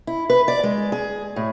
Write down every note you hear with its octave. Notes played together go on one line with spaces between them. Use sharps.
E4
B4
D5
G#3
G#4
A2